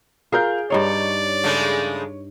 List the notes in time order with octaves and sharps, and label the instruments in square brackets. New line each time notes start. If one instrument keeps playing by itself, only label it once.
[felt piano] F4 A#4 G6 [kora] G#4 F5
[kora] G2 D#4 F5 [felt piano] C#5 [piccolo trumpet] D5
[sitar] C#3 G#3 A3